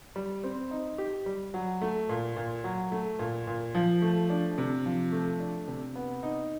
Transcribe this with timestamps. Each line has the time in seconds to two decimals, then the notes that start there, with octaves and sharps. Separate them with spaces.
0.16 G3
0.44 C4
0.71 D#4
0.98 G4
1.26 G3
1.54 F#3
1.81 A3
2.09 A#2
2.36 A#2
2.64 F#3
2.92 A3
3.19 A#2
3.47 A#2
3.75 F3
4.02 A3
4.30 D4
4.58 C3
4.85 F3
5.12 A3
5.40 D4
5.68 C3
5.95 B3
6.23 D#4